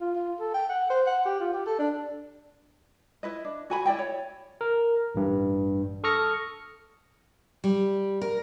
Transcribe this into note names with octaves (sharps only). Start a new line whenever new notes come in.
F4
F4
A4
G5
F#5
C5
F#5
G4
F4
G4
A4
D4
E4 B4 D#5
D4
F#4 G#5 B5
E4 D5 D#5 G5
C#5
A#4
A1 G2
A4 C#6 D#6 F6 A#6 C#7
G3
A#4